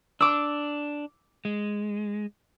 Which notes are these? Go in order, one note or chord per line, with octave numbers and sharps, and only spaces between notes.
D4 D6 E6
G#3